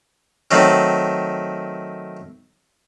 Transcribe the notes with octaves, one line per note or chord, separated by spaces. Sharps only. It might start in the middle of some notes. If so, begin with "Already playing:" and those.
D#3 F#3 A3 C4